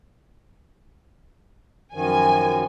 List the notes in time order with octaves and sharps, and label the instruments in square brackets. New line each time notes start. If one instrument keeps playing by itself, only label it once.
[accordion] F#2 D#3 F3 [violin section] G#5